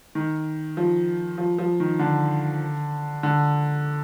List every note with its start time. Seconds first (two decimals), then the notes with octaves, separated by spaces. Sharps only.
0.15 D#3
0.77 F3
1.38 F3
1.59 F3
1.80 D#3
1.99 D3
3.23 D3